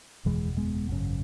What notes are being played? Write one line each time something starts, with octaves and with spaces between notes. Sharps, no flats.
F#1 E2 B2 E3 G#3
G#3 B3
G#1 F#2 C#3